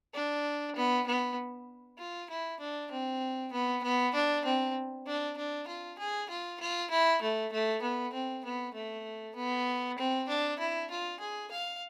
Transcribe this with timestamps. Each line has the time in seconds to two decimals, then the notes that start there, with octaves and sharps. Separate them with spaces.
0.14 D4
0.75 B3
1.07 B3
1.98 F4
2.30 E4
2.60 D4
2.91 C4
3.52 B3
3.83 B3
4.14 D4
4.45 C4
5.06 D4
5.37 D4
5.67 F4
5.98 G#4
6.29 F4
6.60 F4
6.90 E4
7.21 A3
7.52 A3
7.82 B3
8.13 C4
8.45 B3
8.75 A3
9.36 B3
9.98 C4
10.28 D4
10.59 E4
10.90 F4
11.20 G#4
11.51 F5